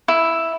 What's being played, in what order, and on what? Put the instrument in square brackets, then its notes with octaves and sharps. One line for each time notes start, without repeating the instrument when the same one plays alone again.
[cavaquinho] E4